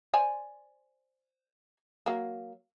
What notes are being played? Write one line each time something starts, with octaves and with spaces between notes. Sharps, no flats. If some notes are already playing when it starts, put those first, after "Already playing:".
C5 D5 G#5
F#3 A#3